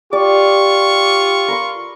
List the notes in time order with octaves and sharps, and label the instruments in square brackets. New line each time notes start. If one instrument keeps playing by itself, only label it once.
[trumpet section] F4 C#6 [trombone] G4 [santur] D5
[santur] A#4 B5 C6